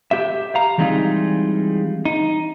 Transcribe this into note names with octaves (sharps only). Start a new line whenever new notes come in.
G4 E5
F5 A#5
E3 G3 G#3 C4 D#4 F4
D#4